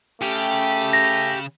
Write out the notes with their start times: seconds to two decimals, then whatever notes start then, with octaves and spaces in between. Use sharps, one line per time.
0.21 C#3 A3 G4
0.93 A#6